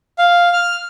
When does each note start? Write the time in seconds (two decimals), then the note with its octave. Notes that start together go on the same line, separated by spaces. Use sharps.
0.18 F5
0.53 F6